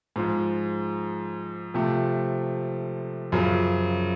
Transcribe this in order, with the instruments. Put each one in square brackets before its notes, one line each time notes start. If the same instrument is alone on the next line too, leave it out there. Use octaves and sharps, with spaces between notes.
[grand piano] G#2 F3 G#3
C3 F3 A3
F#2 C#3 F3